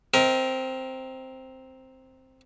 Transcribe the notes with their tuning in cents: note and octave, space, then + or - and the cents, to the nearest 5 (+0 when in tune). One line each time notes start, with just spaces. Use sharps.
C4 +0 A#4 +0 D#5 +30